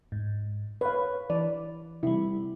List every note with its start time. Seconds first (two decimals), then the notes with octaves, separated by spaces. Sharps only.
0.12 G#2
0.81 B4 C#5 F5
1.30 E3 D5
2.03 C3 G3 E4